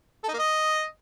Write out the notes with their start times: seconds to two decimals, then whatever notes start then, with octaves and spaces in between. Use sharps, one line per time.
0.23 A4
0.29 D#4
0.34 A#3
0.39 D#5